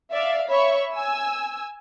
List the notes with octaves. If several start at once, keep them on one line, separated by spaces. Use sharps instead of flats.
D5 E5 F5
C#5 E5 B5 C#6
G#5 E6